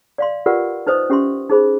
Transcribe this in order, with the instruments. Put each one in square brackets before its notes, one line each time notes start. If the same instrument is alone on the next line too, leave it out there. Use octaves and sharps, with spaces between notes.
[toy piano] D5 F5 C6
F4 G4 A#4 B4 D5 F#5
D#4 B4 C5 D#5 D#6
C#4 G4 E5 C6
D#4 G#4 C5 B5